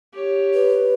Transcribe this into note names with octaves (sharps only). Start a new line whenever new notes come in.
G4 C#5
B4